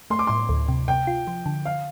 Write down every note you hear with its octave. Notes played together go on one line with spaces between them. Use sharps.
A3 C6
D6
A2 C6
D2
C3
C3 G5
F4
F3
D3
F5